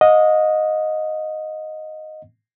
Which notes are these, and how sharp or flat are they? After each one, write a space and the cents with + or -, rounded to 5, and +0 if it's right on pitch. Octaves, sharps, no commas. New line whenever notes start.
D#5 +0 F#5 -45